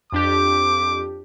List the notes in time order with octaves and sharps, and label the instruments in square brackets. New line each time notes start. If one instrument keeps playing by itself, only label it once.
[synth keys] F2 D4 G4 [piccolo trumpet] D6